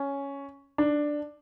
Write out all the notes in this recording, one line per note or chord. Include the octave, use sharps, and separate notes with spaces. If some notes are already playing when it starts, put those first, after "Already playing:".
Already playing: C#4
D4